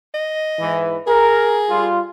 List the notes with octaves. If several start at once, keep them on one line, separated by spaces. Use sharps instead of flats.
D#5
G#2 E3
G#4 A#4
G3 F4